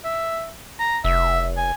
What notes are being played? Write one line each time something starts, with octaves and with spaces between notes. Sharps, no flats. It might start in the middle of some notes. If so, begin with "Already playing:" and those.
E5
A#5
F1 E5
G#5